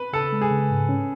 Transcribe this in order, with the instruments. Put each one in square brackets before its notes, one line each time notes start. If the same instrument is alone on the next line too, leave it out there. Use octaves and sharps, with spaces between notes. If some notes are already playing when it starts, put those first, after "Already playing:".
Already playing: [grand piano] B4
[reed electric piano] C#3 [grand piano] A4
[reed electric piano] G#3
[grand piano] G#4
[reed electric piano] C#3
G#2
C#4